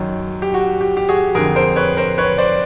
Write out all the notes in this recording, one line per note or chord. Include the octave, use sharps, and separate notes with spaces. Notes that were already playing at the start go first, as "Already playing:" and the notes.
Already playing: F#2 D#3
G4
F#4
G4
G4
F#4 G#4
F2 D3 G#4 A#4
A#4 C5
B4 C#5
A#4 C5
B4 C#5
C5 D5